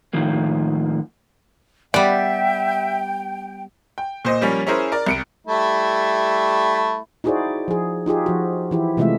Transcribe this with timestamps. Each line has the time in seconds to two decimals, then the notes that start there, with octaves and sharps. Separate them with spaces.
0.13 A2 D#3 F3 A#3
1.94 G3 B3 D5 E5 G5
3.98 G5
4.25 A#2 C5 D#5
4.41 F3 G3 A#3 C#4
4.67 C#4 E4 G#4 A#4 C5
4.92 A#4 D5
5.06 C2 C#7 D7
5.47 G3 A3 E4
7.24 D#4 E4 F#4 G#4 C5 D5
7.68 F3 G#4
8.06 D#4 F4 G4 G#4
8.26 F3 F#4
8.71 E3 E4 G4
8.97 C3 E3 G#3 A3 F4 E5